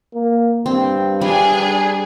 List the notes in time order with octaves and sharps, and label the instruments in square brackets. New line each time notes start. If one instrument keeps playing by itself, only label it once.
[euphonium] A#3
[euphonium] G2 [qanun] C4
[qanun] G3 [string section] D4 G#4 G#5